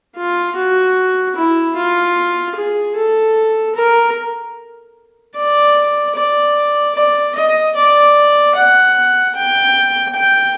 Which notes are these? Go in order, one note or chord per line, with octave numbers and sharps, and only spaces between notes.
F4
F#4
E4
F4
G#4
A4
A#4
D5
D5
D5
D#5
D5
F#5
G5
G5